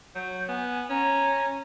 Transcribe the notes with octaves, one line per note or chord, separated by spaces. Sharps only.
F#3 G6
B3 G#5
C#4 A#5